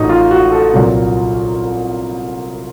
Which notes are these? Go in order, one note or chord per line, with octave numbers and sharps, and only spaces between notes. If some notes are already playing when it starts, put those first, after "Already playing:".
Already playing: A1 A2 F3 A3 D#4 F#4
F4
F#4
A4
C2 A#2 F#3